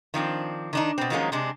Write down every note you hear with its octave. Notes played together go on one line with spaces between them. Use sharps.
D#3 F3 C4 D4
D#3 D4 D#4
B2 C4
D#3 F3 F#3 G#3 A#3 C#4
C3 G#3 D4